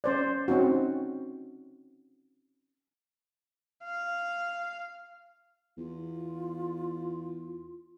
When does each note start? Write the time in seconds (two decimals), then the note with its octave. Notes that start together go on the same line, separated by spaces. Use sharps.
0.04 C#4 C5 D5
0.48 C4 C#4 D#4 F#4
3.84 F5
5.78 E2 F4